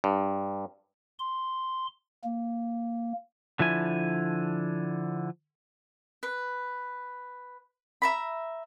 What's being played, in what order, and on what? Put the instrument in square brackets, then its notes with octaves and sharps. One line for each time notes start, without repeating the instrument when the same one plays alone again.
[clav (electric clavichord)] G2
[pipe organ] C6
A#3
[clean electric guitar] D3 F3 E4 G#5
[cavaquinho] B4
E5 A#5 B5